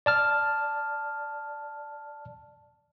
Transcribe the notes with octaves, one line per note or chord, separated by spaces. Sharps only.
D5 A5 F6